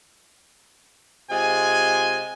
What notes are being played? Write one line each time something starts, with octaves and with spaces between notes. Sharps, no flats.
C3 G#3 F4 G#5